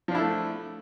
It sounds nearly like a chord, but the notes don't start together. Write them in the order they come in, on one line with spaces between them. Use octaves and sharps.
F3 D4 E4 A4 A3